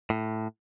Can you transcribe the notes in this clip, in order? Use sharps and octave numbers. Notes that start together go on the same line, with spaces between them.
A2